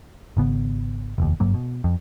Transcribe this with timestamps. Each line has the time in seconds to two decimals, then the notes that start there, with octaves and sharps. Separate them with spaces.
0.37 G#1 C#3 B3
1.18 F1 D#2
1.40 F#1 G2 F#3 A#3
1.54 B2
1.84 F2